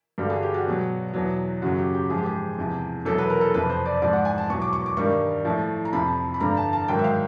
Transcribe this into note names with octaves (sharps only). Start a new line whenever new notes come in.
G2 D3 G3 F#4
G#4
G4
F#4
B2 F#3
E2 B2 F#3
F#2 C#3 F#3 F#4
G4
G4
G#2 F3 G#4
G4
G#4
E2 C3 F3
E2 B2 F#3 A4
B4
A#4
A4
F2 C3 F3 B4
C5
D5
G#2 F3 D5
F#5
G#5
A5
E2 B2 F#3 C#6
D6
C#6
D6
G2 D#3 G3 C#6
A2 F3
A#5
F2 C3 F3 B5
B5
G2 D3 F3 A#5
A5
A5
G#2 D#3 F#3 G5
E5
F5